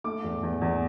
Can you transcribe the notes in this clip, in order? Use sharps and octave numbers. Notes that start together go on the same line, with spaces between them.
A3 D6
E2
E2
E2